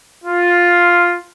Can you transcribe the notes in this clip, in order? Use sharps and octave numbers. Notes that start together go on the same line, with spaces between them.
F4